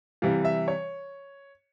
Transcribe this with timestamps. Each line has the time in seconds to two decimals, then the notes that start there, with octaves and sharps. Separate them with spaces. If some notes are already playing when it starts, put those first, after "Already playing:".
0.22 C3 E3 G3 F5
0.45 E5
0.68 C#5